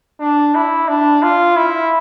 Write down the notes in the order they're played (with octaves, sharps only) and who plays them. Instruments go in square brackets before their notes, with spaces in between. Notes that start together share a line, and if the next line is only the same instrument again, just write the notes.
[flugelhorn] D4
E4
D4
F4
E4